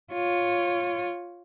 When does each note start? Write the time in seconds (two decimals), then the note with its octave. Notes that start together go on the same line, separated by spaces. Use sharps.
0.12 F4 C#5